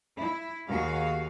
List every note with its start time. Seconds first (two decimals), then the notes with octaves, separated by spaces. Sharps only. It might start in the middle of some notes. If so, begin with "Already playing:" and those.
0.19 E4
0.70 D#2 F#4 G#4 F5